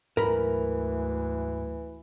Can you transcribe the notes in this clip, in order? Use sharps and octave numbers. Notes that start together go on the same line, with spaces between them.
D2 G#2 E3 F#3 A#4 B5